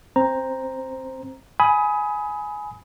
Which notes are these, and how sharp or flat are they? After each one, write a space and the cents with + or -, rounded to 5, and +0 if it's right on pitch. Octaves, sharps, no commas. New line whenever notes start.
C4 +20 C5 +0 A#5 +0
G#5 +10 B5 +0 D#6 +25